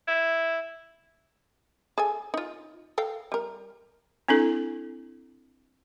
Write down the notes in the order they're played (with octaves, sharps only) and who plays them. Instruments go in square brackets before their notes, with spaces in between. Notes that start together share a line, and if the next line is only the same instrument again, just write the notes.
[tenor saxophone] E4
[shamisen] G#4 A4 G#5
D#4 F4
A4 F5 G5
G3 A#4
[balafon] C4 D4 E4 A4